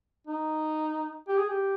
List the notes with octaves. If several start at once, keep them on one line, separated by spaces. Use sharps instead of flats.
D#4
G4
G#4
G4